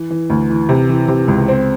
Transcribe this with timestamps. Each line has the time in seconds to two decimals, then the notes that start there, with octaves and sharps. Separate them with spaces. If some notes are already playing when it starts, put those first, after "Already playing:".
Already playing: E3
0.10 E3
0.30 D2
0.50 E3
0.69 C3
0.89 E3
1.08 C3
1.28 C#2
1.48 C4